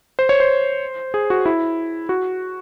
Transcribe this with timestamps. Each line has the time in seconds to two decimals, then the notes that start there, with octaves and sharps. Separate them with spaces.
0.19 C5
0.29 C#5
0.40 C5
1.14 G#4
1.30 F#4
1.46 E4
2.09 F#4